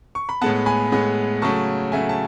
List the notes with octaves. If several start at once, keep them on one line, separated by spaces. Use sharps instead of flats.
C#6
B5
A2 G#3 B3 F#5 A5
G#5 B5
A2 G#3 B3
C#3 F#3 A3 A5 C#6
C#3 F#3 A3 E5 G#5
A5